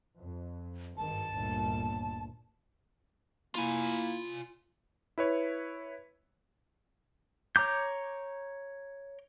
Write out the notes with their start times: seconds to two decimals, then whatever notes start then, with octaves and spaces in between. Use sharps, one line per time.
0.18 F2
0.97 G#1 G2 D#3 A5
1.34 G1 D2 A#2
3.55 A#3 E4 F4 G#5
5.18 E4 B4 C#5
7.56 C#5 A#5 D6 G6